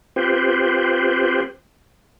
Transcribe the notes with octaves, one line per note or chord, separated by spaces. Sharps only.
C4 F4 G4 B4 C5